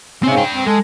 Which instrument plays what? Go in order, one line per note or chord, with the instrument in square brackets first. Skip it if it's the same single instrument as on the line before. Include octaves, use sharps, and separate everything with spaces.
[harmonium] G#2 C#3 C#4 [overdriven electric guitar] C4 E5
[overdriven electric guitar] B4 G5
[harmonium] C4
[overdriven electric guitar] G#3 [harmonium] A4 G#5